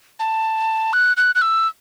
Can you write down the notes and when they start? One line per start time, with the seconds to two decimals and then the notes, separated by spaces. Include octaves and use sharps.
0.19 A5
0.93 F#6
1.17 F#6
1.35 F#6
1.42 E6